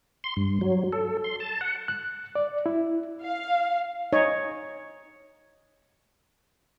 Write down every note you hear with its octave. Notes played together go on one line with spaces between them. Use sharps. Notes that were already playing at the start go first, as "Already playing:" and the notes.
C6
G2
F#3
A4
C6
A5
F#5
F#6
D5
E4
F5
D#4 C#5 D#5